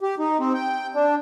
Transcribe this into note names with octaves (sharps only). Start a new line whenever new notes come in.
G4
D#4
C4
G5
D4